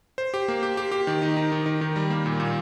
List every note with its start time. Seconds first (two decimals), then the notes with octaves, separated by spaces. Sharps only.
0.18 C5
0.34 G4
0.48 A#3
0.63 G4
0.77 G4
0.92 G4
1.07 D#3
1.22 D#4
1.37 D#4
1.52 D#3
1.66 D#3
1.81 D#3
1.96 G3
2.10 A#3
2.26 A#2
2.40 A#2